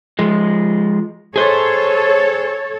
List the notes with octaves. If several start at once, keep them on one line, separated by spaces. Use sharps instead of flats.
F3 G#3
G#4 A4 C5 C#5